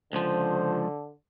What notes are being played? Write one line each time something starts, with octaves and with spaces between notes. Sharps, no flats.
C#2 D3 F3 C5